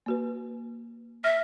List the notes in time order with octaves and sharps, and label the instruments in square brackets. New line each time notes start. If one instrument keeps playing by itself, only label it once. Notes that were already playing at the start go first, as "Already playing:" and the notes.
[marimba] A#3 F#4 B4
[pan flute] E5 [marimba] F6 A#6